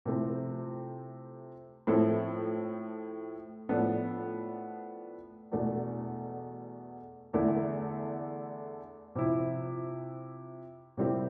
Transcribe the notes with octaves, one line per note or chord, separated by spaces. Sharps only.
C3 F3 A3 C4 E4
A2 F3 C4 E4 A4
A2 F3 B3 D4 A4
E2 B2 A3 D4 A4
E2 D3 A3 E4
C3 F3 C4 E4
C3 G3 C4 E4 G4